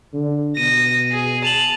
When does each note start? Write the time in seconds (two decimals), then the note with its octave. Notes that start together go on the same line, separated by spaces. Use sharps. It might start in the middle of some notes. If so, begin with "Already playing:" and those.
0.13 D3
0.57 B2 A#6 D#7
1.11 G#4
1.45 A5 F7 F#7